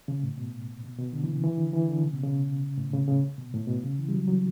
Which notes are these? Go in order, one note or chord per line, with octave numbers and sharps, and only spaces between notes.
C#3
A2
B2
B2
B2
D3
E3
C#3
E3
D3
E3
D3
C#3
B2
C#3
A2
B2
C#3
C#3
B2
A2
B2
C#3
E3
G3
F#3
F#3